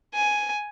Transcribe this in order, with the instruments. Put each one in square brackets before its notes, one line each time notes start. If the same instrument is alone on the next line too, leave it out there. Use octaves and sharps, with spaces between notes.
[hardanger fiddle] G#5